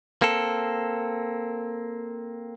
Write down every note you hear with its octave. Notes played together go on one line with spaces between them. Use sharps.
A#3 C4 A4